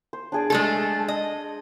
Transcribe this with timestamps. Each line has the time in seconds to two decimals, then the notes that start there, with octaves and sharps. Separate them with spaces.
0.13 C5
0.32 D4 G#4 D5
0.50 G#3 A3 A4
1.08 D#5